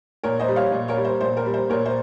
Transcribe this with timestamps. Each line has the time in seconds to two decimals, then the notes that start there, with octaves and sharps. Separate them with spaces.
0.24 A#2 A#4 C#5
0.39 C5 D#5
0.48 G3
0.56 C#5 F5
0.72 A#2
0.88 A#4 C#5
0.97 G3
1.05 C5
1.21 A#2 C5
1.37 A#4
1.45 G3
1.54 C5
1.70 A#2 A#4 C#5
1.86 C5